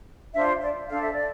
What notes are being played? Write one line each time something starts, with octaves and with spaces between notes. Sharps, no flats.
D4 F4 C5 E5
D5
D4 A4 C5 F5
E5
D5